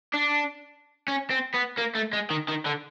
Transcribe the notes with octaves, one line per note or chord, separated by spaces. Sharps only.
D4
C#4
C4
B3
A#3
A3
G#3
D#3
D#3
D3